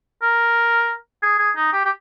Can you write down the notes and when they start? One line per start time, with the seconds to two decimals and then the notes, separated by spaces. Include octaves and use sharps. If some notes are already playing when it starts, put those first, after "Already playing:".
0.22 A#4
1.23 G#4
1.39 G#4
1.56 D#4
1.73 G4
1.85 G4